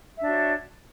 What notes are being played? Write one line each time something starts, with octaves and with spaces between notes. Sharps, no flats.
D4 F#4 C#5 E5